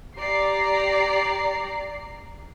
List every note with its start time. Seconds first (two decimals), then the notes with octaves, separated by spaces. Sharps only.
0.18 G4 D5 A#5 C7